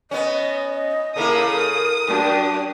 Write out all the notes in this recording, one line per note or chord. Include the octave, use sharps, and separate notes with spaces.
B3 C#4 D#5
C#3 A#3 E4 A4 A#4 A#5 D#6
F#2 D4 F#4 G4